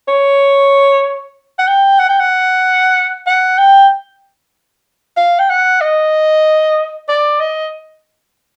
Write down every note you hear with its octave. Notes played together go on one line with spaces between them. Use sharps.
C#5
F#5
G5
F#5
G5
F#5
F#5
G5
F5
G5
F#5
D#5
D5
D#5